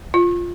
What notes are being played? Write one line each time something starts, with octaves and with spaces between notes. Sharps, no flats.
F4